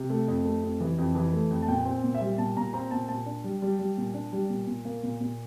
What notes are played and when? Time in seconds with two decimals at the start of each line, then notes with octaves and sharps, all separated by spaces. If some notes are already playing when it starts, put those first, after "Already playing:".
Already playing: C3
0.10 A3
0.28 F2
0.45 A3
0.63 F2
0.80 E3
0.98 F2
1.15 E3
1.33 A3
1.51 F2
1.62 A5
1.68 A#2 G5
1.85 C4
2.04 A#2
2.15 E5
2.21 G3
2.38 A#2 A5
2.57 A#2 A#5
2.73 C4 A#5
2.91 A#2 A5
3.08 A#2 A5
3.26 D4
3.44 G3
3.62 G3
3.79 G3
3.98 A#2
4.14 D4
4.32 G3
4.50 A#2
4.67 A#2
4.85 A#3
5.03 A#2
5.21 A#2